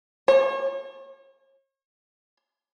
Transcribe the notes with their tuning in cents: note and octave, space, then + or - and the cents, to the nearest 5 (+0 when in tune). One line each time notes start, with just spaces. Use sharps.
C#5 -40